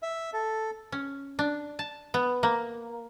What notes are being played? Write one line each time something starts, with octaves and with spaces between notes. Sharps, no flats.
E5
A4
C#4
D4
A5
B3
A#3